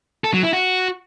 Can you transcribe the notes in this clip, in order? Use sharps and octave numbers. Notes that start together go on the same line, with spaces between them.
A4
F#3
E4
F#4